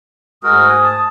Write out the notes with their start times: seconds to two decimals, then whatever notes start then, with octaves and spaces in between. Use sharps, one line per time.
0.43 G#2 G#3 A3 F#4 A#4 D#6
0.69 G#5
0.84 A5